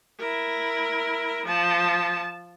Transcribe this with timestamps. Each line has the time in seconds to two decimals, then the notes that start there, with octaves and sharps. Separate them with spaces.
0.19 E4 A#4
1.46 F3 A5